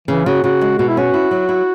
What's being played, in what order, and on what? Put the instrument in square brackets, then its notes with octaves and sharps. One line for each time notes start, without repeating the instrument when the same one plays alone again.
[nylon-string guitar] C#3 [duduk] E3
[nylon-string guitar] C#3 [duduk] F#4
[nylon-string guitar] C#3 [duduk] F#4
[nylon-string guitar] G#3
[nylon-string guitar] B2 [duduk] F#4
[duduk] E4
[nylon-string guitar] C#4 [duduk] F#4
[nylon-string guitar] E4
F#3
E4